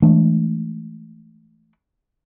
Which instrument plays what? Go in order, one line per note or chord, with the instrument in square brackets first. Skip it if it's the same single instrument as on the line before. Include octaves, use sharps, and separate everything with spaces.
[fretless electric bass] E3 G#3 A3 D4